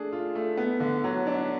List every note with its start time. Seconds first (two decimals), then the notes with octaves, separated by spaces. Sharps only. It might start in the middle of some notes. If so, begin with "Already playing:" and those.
Already playing: A3 D4 G#4
0.12 F4
0.35 A3
0.57 B3
0.80 D3
1.04 F#3
1.27 D4